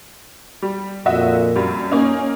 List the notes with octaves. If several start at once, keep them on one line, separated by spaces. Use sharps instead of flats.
G3
F2 A#2 F#4 D#5 E5
F#2 G3
A#3 C#4 D#4